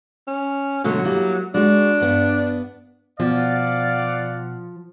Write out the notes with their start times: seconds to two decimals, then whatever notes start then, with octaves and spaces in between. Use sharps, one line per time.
0.28 C#4
0.84 B2 D3 F#3 A3
1.04 G3 A#3 E4
1.54 G#3 D4 F#4
2.00 G2 B3
3.20 B2 F3 D5 F5 F#5